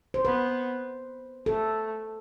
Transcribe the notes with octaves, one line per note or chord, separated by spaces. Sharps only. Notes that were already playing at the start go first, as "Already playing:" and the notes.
C5
B3 B4
A3 A4